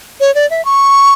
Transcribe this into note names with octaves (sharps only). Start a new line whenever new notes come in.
C#5
D5
E5
C#6